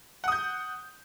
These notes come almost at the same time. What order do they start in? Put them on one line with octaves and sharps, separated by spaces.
F#5 D#6 G6